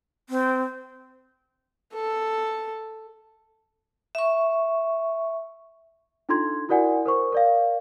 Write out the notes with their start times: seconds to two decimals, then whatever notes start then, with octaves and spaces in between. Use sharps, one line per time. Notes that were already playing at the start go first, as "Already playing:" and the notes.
0.30 C4
1.94 A4
4.15 E5 C#6
6.29 D4 D#4 F4 A4 C6 G#6
6.69 E4 F#4 A#4 D5 F#5 G#5
7.06 A#4 C5 C#6
7.32 A#4 D5 F5